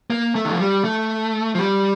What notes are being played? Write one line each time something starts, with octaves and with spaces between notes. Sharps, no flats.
A#3
A3
D#3
F3
G3
A3
F3
G3